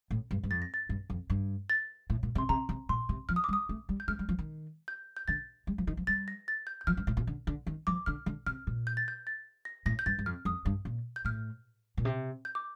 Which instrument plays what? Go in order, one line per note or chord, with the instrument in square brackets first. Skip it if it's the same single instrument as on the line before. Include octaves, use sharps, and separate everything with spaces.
[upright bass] A2
G2
G2
[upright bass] F2 [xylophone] A6
[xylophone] A#6
A6
[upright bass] G2
F2
G2
[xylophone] A6
[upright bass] A2
A#2
C3
[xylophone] C6
[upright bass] C3 [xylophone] A#5
[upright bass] C3
[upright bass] A#2 [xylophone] C6
[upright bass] C3
[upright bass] F3 [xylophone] F6
[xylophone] D#6
D6
[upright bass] G3
[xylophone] D#6
[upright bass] A3
G3
[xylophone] G6
[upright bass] A3 [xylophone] F6
[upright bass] G3
F3
D#3
[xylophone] G6
G6
[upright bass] D3 [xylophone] A6
[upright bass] G3
F3
D#3
F3
[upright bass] G3 [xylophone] A6
[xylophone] A#6
A6
G6
G6
[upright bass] F3 [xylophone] F6
[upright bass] G2
A2
A#2
D3
D3
D#3
[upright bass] F3 [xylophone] D6
[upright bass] D3 [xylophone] F6
[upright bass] D3
[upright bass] C3 [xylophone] F6
[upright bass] A#2
[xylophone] G6
A6
G6
A6
A#6
[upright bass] A2 [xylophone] A#6
[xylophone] G6
[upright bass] G2 [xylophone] A6
[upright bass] G2
[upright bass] F2 [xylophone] F6
[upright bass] F2 [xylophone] D#6
[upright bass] G2
A#2
[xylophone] G6
[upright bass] A2 [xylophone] F6
[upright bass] A#2
C3
[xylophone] G6
D6